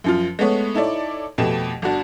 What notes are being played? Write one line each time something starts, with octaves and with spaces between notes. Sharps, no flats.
F#2 F3 F4
G#3 A3 B3 C#5
D#4 E4 A4 C#5 D5
F2 B2 A3 G4 E7
G1 D4 F#4 A5